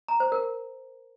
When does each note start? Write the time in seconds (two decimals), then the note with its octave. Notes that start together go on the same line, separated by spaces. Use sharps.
0.08 A#5
0.20 C5
0.32 A#4